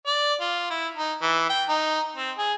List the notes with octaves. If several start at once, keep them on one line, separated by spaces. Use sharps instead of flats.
D5
F4
E4
D#4
E3
G5
D#4
C4
G#4